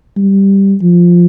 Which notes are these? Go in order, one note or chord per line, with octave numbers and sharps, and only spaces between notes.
G3
F3